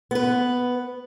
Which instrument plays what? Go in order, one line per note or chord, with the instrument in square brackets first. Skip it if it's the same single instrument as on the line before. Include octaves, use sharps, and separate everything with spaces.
[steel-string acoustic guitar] B3 B4